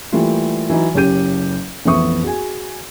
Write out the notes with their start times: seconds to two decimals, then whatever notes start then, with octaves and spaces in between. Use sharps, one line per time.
0.12 E3 G3 A3 A#3 F4
0.70 E3 F#3 D#4
0.94 F#1 C#4 G4 G6 D#7
1.85 A1 F2 B3 E5 C#6 D#6
2.24 F#4 G#4 G#5